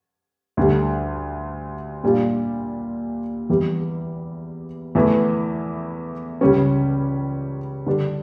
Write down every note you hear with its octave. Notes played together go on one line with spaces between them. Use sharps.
D2 D3 G3
A#2 G3 D4 F4
E2 E3 G3
E2 E3 A3 E4
C#2 C#3 G3 C#4
D3 G3 D4